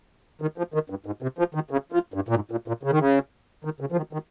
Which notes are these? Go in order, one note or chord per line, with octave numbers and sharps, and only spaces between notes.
D#3
F3
D#3
G2
G#2
C3
F3
D#3
C#3
F3
G2
A#2
G#2
A#2
A#2
C#3
D#3
C#3
D#3
C#3
F3
D#3
D#3